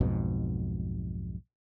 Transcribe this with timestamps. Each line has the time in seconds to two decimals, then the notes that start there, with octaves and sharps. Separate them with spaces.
0.01 B1 F2 G#2 B2